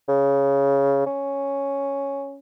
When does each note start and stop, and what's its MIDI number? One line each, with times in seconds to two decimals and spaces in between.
0.08 1.04 49
1.06 2.39 61